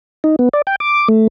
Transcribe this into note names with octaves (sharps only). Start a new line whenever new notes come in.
D#4
B3
D5
G5
D6
A3